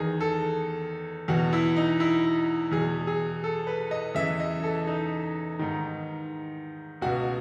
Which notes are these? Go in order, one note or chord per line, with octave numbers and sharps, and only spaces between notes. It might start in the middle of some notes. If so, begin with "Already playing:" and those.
Already playing: E2 D#3 G#4
A4
E2 B2 F#4
E4
D#4
E4
E2 B2 G#4
G#4
A4
B4
D#5
E2 C#3 E3 E5
D#5
A4
D#4
G#2 D#3
C#2 B2 F#4